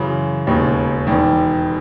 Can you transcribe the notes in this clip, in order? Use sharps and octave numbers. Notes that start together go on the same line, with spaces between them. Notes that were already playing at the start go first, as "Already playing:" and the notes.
Already playing: F#2 C#3 E3
E1 D#2 C#3
E1 E2 D#3